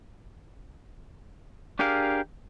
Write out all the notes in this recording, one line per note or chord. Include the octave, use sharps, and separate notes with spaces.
D4 G4 G#4 A#4 F5